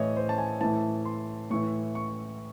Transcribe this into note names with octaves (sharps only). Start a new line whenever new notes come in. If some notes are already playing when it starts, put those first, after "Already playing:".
Already playing: A2 E3 C#5 D#5
C5
A5
G#5
A2 E3 A5
C6
A2 E3 C#6
C#6